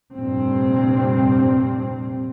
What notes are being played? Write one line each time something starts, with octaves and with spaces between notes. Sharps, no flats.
F1 G2 A#2 C4